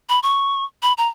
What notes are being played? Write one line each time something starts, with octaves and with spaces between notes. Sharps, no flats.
B5
C#6
B5
A#5